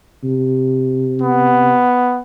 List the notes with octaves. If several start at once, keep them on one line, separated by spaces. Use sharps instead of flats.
C3
B3